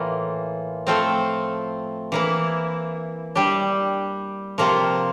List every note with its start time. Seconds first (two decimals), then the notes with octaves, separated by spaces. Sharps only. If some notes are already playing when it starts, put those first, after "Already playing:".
Already playing: A2 E3 A#3 F4
0.87 F3 A3 C4 F4 A4
2.12 E3 A#3 E4
3.35 G3 D4 G4
4.58 C3 F3 A#3 F4